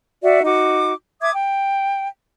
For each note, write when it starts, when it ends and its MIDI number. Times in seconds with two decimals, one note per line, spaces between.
0.21 0.41 66
0.21 0.41 74
0.21 0.41 76
0.43 0.92 63
0.43 0.92 66
0.43 0.92 86
1.20 1.31 76
1.20 1.31 86
1.20 1.31 87
1.20 1.31 92
1.35 2.09 79